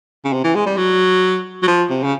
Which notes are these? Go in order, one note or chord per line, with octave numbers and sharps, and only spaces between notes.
C#3
C3
E3
G#3
G3
F#3
F#3
F3
C3
C#3